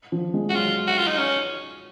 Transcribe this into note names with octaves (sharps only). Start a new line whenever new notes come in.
F3
G#3
F#4
F#3 F4
F#4
F4
D#4
C#4